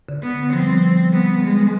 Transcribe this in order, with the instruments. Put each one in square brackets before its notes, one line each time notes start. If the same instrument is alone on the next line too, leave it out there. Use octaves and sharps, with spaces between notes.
[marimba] D3
[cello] B3
[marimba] F3 [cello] C4
[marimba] G3
F3
[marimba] G3 [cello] B3
[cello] G#3